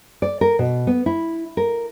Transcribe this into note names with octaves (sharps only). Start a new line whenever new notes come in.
D5
A#4
B2
B3
E4
A#4